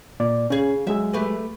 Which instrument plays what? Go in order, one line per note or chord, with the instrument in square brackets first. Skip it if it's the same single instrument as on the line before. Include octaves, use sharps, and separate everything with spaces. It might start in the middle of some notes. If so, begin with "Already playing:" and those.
[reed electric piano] A#2 A#3 D5
[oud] C#3 G#4 [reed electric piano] C#4
[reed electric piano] F#3 G#3 G#4 [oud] E5
[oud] A3 G4 B4